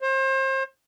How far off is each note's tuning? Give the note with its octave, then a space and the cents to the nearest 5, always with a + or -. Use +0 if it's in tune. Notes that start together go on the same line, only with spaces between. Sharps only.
C5 +35